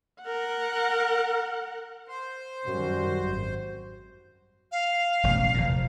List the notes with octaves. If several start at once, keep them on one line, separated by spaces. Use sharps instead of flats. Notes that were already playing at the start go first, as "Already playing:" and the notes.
A#4 F#5
C5
F#2 D#3 G3 F#4
G#1
F5
E1 A1 F#2
F1 D#2 A#2